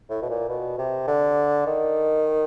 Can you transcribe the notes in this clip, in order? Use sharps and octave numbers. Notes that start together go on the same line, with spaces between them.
A2
B2
A#2
B2
C3
D3
D#3